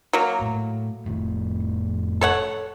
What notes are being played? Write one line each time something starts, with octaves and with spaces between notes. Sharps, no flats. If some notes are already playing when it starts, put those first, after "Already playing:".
F#3 A#3
A2
F1 A2
A4 C#5 F#5